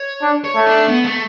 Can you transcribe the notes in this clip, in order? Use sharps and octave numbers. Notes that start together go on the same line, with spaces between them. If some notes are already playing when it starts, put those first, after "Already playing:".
Already playing: C#5
D4
C#5
A3
D4
B3
A3